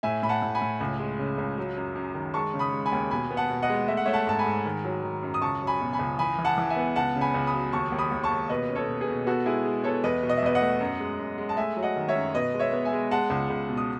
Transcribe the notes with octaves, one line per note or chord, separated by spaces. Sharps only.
A2 E5 G#5
A2 B5
F#5 A5
A2
G#5 B5
A2
C#2
G#3
C#3
C#2
F#3
F#2
F#2
D#3
G#3 A5 C#6
C#3
B5 D#6
G#3
G#5 B5
D#2
B2 G#5 B5
B3
F#5 A5
B2
D#5 F#5
G#3
A3 E5
F#5
A3 C#5 E5
F#5 A5
G#2 A5
G#5 B5
G#2
D#3
F#3
D#3
F#2
D#6
C#2 A5 C#6
F#3
G#5 B5
B2
G#5 B5
C#2
E3 G#5 B5
E3
F#5 A5
E3
E5 G#5
B3
C#2 F#5 A5
C#3
G#5 B5
C#2
B5 D#6
F#3
D#2 A5 C#6
D#2
B5 D#6
D#2
A5 C#6
D#2
B2 B4 D#5
C#4
A4 C#5
B2
G#4 B4
B2
B3 F#4 A4
G#3 E4 G#4
G#3
B3 A4 C#5
E2 B4 D#5
B2
D#5
E5
E2 B4 D#5
D#5 F#5
A3
F#2
G#3
F#2
G#3
A5
A3 E5 G#5
F#3
D#5 F#5
D#3
C#5 E5
F#2
B2 B4 D#5
G#3
C#5 E5
B3
E5 G#5
G#3
G#3 F#5 A5
C#2
C#2
B2
D#6